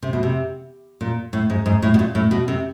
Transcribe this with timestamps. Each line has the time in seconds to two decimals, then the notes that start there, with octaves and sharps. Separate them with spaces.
0.03 C3
0.13 B2
0.23 C3
1.01 A#2
1.33 A2
1.50 G#2
1.66 G#2
1.82 A2
1.94 B2
1.99 A#2
2.15 A2
2.31 B2
2.48 C3